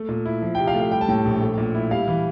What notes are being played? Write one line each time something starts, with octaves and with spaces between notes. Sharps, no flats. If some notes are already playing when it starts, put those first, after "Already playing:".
Already playing: A3
A#2
E4
F3
C3 G5
F5
A3
F5
G3 G5
A5
A2 G5
A#1
A3
A#2
E4
G3 F5
E3